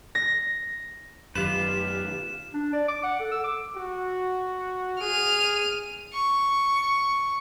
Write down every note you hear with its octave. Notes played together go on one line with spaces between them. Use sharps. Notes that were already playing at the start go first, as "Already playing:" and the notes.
A#6
F#2 D#3 F4 G4 B4 E7
D4
D5
D6
F#5
A4
E6
D6
F#4
G#4 F6 D#7
C#6